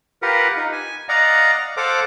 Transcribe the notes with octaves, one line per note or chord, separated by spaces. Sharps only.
F4 G4 A#4 B4 F#5
D#4
G#5
D5 D#5 F5 F#5 A#5
A4 C5 F5 F#5 D6